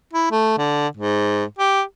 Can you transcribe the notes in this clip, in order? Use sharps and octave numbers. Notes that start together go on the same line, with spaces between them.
E4
A3
D3
G#2
G4